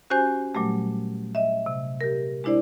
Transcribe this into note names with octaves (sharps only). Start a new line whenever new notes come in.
C#4 F#4 G4 C5 G#5 G6
A#2 F#3 G3 A3 G4
D#5 E5
C3
G4 A#4
G#3 D4 E4 C5 D5